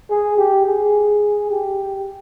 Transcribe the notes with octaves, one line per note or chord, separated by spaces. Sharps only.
G#4
G4
G#4
G4